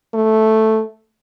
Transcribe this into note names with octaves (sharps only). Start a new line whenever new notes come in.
A3